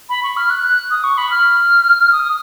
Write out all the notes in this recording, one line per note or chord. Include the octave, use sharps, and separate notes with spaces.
B5
C#6
F6
F#6
F#6
D#6
C#6
B5
F6
D#6